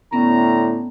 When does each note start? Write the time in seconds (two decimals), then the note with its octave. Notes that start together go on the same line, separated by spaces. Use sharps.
0.13 A2 D3 B3 C#4 A#5